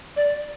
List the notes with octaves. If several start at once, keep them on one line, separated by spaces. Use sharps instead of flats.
D5